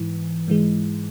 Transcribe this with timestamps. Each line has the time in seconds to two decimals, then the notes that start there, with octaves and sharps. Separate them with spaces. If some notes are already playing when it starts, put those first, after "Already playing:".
Already playing: G#2 E3
0.48 G#2 E3 G#3